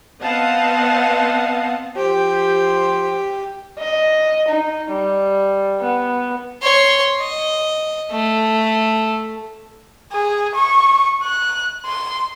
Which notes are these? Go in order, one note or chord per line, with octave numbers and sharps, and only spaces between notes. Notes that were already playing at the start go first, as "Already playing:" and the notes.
B3 C4 D#5 F5 F#5 A5
F3 G4 C5
D#5
D#4
G3
B3
C#5 C6
D#5
A3
G#4
C#6
F#6
C6